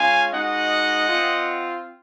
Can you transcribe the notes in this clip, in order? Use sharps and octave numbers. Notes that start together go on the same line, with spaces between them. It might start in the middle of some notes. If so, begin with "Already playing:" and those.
Already playing: G#3 C#4 F4 F5 G#5
G#3 D#4 F#4 D#5 F#5
C4 F4